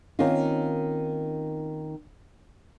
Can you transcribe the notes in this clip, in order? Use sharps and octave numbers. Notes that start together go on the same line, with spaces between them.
D#3 A#3 C4 C#4 D#4 F4